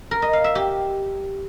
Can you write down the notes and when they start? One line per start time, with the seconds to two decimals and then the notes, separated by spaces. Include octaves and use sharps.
0.11 A#4
0.22 D#5
0.33 F5
0.44 E5
0.55 G4